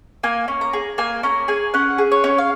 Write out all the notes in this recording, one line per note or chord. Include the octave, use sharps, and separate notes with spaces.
A#3 G#5
C#4
A#5
G#4
A#3 G#5
C#4 A#5
G#4 G#5
C#4 F#5
G#4
C#5
C#4
F5